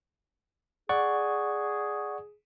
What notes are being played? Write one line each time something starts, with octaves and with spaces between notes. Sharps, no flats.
G#4 D5 F#5 C#6